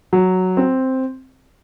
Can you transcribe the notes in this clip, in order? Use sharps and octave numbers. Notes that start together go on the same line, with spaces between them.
F#3
C4